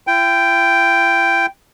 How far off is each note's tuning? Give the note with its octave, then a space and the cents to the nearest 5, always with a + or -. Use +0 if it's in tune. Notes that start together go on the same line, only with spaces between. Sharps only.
E4 +45 G5 +0